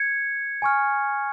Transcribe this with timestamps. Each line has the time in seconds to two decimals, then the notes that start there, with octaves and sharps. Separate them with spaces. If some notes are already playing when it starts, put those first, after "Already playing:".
Already playing: G#6 C#7
0.62 G#5 C#6 F6